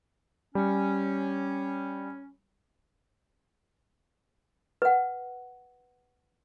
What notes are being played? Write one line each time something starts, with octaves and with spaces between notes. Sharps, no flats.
G3 C#4
B4 F#5